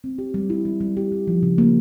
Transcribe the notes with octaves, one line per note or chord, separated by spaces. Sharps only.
C4
G4
G3
E4
G3
G3
G4
G3
F3
C#3
A#3